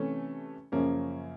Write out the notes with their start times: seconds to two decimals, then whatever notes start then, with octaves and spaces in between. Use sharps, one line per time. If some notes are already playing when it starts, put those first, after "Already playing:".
Already playing: C3 E3 A3 C#4
0.72 F#2 C#3 F3 A#3 C#4